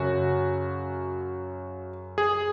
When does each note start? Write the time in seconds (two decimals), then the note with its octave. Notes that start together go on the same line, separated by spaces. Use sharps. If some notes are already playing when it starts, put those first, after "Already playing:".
Already playing: F#2 C#3 F#4
2.18 G#4